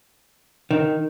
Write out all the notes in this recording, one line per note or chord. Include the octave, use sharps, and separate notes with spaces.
D#3